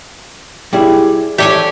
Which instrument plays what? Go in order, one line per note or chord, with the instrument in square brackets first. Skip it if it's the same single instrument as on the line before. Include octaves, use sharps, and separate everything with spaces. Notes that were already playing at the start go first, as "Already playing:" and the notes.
[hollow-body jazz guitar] G3 E4 G#4
[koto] G4 C#5 G#5 [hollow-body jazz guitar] A4 D5 E5